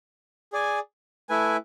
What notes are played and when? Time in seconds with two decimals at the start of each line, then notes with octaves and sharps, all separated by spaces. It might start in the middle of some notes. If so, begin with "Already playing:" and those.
0.53 G#4 D5 G#5
1.29 A3 E4 B4 E5 G#5